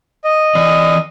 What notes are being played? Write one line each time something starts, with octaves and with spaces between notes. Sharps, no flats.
D#5
E3 D5